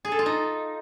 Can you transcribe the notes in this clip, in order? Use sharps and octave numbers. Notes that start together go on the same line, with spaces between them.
G#4
A4
F4
D#4